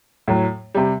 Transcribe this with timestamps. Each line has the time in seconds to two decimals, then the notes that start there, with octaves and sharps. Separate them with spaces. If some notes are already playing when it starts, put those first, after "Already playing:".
0.28 A2 F#3
0.75 C3 G3